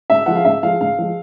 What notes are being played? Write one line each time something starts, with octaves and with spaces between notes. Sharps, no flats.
G#2 E5
F3 G#3 F#5
F5
G#2 E5
F3 G#3 F5
G#2 F5
F3 G#3